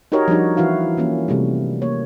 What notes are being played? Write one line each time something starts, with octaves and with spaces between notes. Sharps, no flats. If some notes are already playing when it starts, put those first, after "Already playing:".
D#4 F#4 G4 A#4 C#5 D#5
F3 G3 D4 D#4 F#4
E3 E4 F#4 F5
E3 A#3 C#4
C3 G3 A3
A#3 C#5